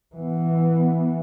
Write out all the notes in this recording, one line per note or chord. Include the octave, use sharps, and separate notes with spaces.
E3 B3